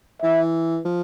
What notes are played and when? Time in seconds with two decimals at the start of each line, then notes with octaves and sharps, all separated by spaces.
0.22 E3 E5
0.85 F3